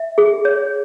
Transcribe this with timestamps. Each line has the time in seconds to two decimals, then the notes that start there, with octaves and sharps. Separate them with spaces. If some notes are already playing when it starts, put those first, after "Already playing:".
Already playing: E5
0.18 G#4
0.45 C#5